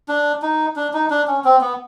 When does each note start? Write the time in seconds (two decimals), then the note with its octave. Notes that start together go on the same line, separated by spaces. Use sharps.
0.09 D4
0.42 D#4
0.76 D4
0.94 D#4
1.11 D4
1.28 C#4
1.45 C4
1.61 B3